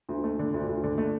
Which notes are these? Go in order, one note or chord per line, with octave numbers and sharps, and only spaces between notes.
D2
A3
D3
D2
D2
D3
A3